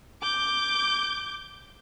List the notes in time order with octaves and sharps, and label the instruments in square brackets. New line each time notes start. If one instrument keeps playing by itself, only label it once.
[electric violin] D6 G6